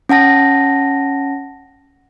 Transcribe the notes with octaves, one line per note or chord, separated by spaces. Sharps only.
C#4 F#5 A5 A#6